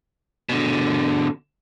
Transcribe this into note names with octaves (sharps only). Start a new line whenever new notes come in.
B2 D3